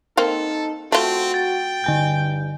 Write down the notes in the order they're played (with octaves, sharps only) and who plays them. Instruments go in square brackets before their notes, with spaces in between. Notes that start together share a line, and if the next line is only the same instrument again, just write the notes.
[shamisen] A#3 C4 F5 [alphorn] D#4 [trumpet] A4
[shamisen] A3 F4 [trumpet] C4 [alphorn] F#4
[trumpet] G5 [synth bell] A6
[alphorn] G2 [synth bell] D3 G#5 G6